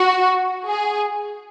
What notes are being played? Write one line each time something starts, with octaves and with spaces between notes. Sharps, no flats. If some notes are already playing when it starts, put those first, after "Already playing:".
Already playing: F#4
G#4